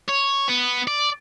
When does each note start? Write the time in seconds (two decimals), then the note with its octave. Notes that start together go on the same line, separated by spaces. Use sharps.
0.08 C#5
0.48 B3
0.87 D5